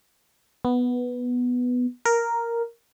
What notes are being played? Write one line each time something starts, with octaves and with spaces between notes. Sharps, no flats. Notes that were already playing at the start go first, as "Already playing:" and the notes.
B3
A#4